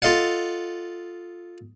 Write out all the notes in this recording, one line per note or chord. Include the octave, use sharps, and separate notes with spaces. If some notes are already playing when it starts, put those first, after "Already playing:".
F4 A4 D#5 F5 F#5